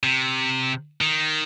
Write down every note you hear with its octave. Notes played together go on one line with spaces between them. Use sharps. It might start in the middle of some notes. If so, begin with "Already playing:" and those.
C3
D#3